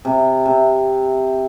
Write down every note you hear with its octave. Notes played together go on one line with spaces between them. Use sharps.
C3
C3